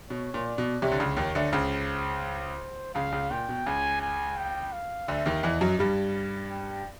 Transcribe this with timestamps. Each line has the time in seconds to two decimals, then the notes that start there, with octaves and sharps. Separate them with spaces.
0.10 B2 C#5
0.34 A#2
0.46 D5
0.58 B2
0.81 C2 C3 C#5
0.92 D3
1.00 C#2 C#3
1.17 D#2 D#3
1.35 D2 D3
1.53 C#2 C#3 C5
2.95 C#2 C#3 F5
3.12 C#2 C#3
3.31 A#2 G5
3.49 B2
3.66 C#2 C#3 G#5
4.02 G#5
4.37 G5
4.73 F5
5.08 D2 D3 E5
5.26 D#2 D#3
5.43 E2 E3 D#5
5.61 F#2 F#3
5.79 G2 G3
6.50 G5